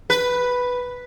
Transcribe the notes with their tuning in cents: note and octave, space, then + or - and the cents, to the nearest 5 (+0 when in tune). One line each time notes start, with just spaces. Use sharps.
B4 +0